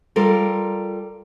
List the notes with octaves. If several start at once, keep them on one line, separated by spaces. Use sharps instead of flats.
G3 F4 A4 A#4